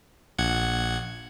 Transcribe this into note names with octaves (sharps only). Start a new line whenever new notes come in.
A#1 F#5 G#6